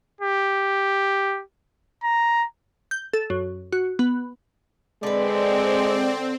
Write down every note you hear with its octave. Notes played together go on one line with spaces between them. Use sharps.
G4
A#5
G6
A4
F#2
F#4
B3
D3 G#3 C4 B4 D5